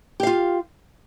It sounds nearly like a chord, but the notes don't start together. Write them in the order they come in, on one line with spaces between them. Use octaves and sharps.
G4 F5 F4